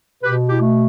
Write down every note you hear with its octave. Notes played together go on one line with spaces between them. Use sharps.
B2 G4 B4
E4 G4
A3